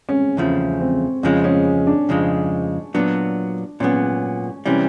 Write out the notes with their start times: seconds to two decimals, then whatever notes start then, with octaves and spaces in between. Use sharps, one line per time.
0.09 C#4
0.37 E2 C#3 F3 A3 C#4
0.81 C4
1.23 F2 C#3 F3 G#3 C#4
1.44 C#4
1.87 D4
2.09 F2 C#3 F3 G#3
2.94 A#2 F#3 B3 D4
3.80 A#2 F#3 B3 C#4
4.66 C3 E3 G3 C#4